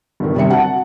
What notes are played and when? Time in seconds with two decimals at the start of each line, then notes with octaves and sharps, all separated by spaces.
0.20 G1 D3 D#3
0.35 C3 G3 C4 E5 C#7
0.50 F#4 F#5 A5